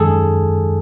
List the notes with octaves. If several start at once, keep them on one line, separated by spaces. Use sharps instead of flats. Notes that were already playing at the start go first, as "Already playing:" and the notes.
Already playing: F#2 D#3 G#3 G#4 A4